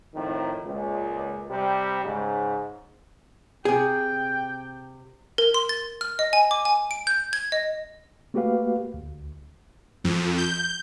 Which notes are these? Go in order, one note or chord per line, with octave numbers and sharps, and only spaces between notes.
F2 A2 D#3
C#2 A#2
C3 G3
G#2 C#3
C3 G#4 G5
A#4
C6
A6
F6
D#5
G#5
D6
G#5
D7
G6
G#6
D#5
A3 A#3 F#4 G4 B4 F5
D2
F2
G6